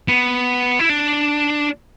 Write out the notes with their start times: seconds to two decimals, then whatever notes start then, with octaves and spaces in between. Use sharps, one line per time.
0.08 B3
0.79 E4
0.89 D4